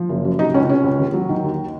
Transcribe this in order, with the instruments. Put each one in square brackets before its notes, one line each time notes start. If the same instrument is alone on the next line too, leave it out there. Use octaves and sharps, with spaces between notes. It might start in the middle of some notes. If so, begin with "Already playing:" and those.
Already playing: [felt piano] F3
F#1
F#2
C3 D#4
C#2 C#4
C3 C#4
C#2
D#2
F#3
D#3
D#2